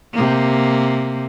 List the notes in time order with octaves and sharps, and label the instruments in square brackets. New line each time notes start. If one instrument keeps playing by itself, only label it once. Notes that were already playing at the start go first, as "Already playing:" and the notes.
[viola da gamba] C3 A#3